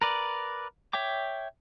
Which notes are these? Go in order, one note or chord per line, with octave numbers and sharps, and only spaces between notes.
A#4 B4 D5
C#5 E5 G5 D6